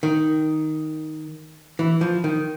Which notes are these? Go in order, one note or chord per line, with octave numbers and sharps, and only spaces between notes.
D#3
E3
F3
D#3